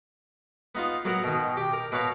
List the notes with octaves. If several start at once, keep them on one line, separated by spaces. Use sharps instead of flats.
B3 D#4 F4
F#3 B3 F#4 A#4
B2 D#3
G4
A#4
B2 B4 C#5 F5 A#5